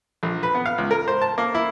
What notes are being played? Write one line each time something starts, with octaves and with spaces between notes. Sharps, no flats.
A#1
B4
B3
F5
C#2
A#4
C5
A5
A#3
E4